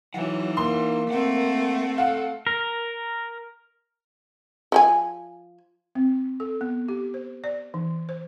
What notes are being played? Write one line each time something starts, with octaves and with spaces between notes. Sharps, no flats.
E3 F#3 D#4 F#5
A#3 C6
A3 C4 F#5
A4 F5 F#5
A#4
F3 G5 G#5
C4
A4
B3
G4
C5
D5
E3
C5